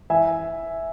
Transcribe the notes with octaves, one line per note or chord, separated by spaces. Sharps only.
E3 E5 G#5